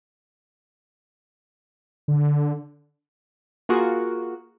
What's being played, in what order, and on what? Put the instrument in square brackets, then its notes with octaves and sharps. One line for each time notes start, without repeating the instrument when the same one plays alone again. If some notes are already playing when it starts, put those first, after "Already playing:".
[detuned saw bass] D3
[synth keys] A#3 F4 F#4 G#4 A#4